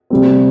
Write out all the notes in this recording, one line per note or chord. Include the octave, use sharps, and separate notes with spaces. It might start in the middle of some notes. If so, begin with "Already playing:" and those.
C3 G3 C4